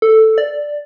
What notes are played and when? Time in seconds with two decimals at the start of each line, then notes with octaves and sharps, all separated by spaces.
0.02 A4
0.38 D5